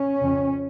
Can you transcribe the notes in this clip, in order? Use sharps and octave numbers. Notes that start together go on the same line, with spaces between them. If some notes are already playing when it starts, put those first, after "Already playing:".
Already playing: C#4
F2 C#3